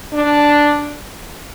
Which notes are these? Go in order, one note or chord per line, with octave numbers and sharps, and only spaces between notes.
D4